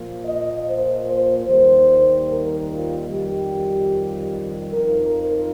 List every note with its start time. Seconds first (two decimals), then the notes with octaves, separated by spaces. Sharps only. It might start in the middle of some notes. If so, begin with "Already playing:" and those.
Already playing: A#2 F3 A#3
0.24 D#5
0.65 C5
1.05 C5
1.46 D#2 D#3 G3 D#4 C5
2.27 A#4
2.69 F4
3.09 F2 D#3 G3 G4
4.72 F2 F3 D#4 A#4
5.12 A#4